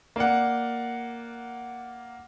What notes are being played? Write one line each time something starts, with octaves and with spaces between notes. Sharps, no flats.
A#3 D5 F#5